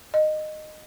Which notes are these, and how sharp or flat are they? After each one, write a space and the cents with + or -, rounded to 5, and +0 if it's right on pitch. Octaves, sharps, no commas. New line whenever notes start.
D#5 -15